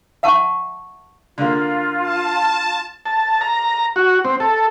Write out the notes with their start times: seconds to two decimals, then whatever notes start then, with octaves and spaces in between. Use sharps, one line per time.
0.23 E5 F#5 A5 C#6
1.38 D3 A#3 F4
2.01 A5
3.06 A5
3.41 A#5
3.96 F#4
4.25 C4
4.40 A4